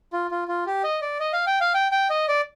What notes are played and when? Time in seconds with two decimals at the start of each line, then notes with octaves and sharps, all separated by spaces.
0.13 F4
0.31 F4
0.48 F4
0.66 G4
0.84 D#5
1.02 D5
1.20 D#5
1.33 F5
1.47 G5
1.61 F5
1.74 G5
1.92 G5
2.10 D#5
2.28 D5